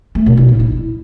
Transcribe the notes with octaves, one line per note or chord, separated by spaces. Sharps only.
A3
B2
E4
A#2
E4